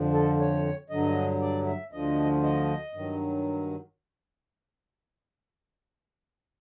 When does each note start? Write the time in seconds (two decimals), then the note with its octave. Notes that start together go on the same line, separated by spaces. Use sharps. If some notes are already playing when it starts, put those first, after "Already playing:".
Already playing: F2 D3 F3
0.13 A4
0.39 C#5
0.90 G2 D3 F#3 D#5
1.41 D5
1.66 E5
1.92 D2 D3 F3 D#5
2.43 D#5
2.93 G2 D#3 F#3